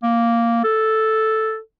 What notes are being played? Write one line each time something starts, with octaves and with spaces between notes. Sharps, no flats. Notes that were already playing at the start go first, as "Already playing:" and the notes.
A#3
A4